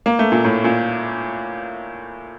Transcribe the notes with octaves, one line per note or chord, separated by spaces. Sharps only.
A#3
A3
A#2
A2
A#2